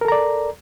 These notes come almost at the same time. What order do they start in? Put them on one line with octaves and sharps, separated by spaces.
A#4 A4 A#5 D5